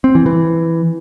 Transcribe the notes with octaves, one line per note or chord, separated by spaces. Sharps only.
C4
E3
E3